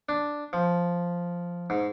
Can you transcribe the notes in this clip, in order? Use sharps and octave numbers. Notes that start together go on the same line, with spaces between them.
D4
F3
G#2